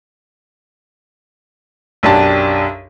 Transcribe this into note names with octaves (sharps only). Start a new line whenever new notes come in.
B1 F#2 D4 G4 A5